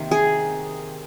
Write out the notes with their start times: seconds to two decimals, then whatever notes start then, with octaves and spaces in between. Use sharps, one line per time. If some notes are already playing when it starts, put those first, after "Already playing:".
Already playing: C3 D#3 A#3
0.11 G#4